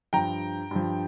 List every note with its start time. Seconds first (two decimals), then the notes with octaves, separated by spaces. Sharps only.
0.13 G2 F3 G5 A#5
0.71 G2 F3